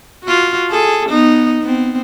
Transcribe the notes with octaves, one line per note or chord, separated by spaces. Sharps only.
F4 F#4
G#4 A4
B3 D#4
B3 C4